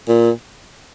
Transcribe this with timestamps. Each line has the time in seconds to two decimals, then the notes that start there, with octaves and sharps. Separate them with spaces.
0.08 A#2